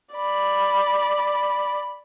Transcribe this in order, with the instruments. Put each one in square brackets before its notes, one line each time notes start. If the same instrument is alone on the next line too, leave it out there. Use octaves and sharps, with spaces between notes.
[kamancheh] D5 B5